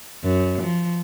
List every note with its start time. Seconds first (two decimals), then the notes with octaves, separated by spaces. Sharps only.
0.24 F#2
0.62 F3